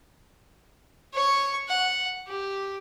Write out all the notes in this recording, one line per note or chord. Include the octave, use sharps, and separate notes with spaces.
C#5 C#6
F#5
G4